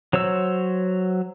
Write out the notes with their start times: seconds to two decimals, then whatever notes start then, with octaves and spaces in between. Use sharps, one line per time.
0.13 F#3 C5 C#5 E6